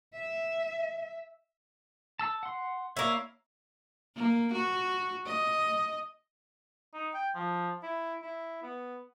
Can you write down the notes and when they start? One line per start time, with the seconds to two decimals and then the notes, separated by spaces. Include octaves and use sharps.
0.14 E5
2.19 A5 E6
2.43 F#5 C6
2.97 A#3 E4 C#5
4.16 A#3
4.53 F#4
5.26 D#5
6.94 D#4
7.14 G5
7.35 F3
7.83 E4
8.22 E4
8.63 B3